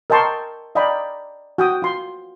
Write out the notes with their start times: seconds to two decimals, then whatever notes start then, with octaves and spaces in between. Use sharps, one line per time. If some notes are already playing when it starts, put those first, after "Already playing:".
0.10 A#4 D#5 G5 A5 C6 C#6
0.75 D5 D#5 F5 G5 A#5 B5
1.58 F#4 G5 D#6
1.82 F4 C6